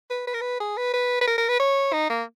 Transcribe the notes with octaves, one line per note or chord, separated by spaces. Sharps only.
B4
B4
A#4
B4
G#4
B4
B4
B4
A#4
A#4
B4
C#5
D#4
A#3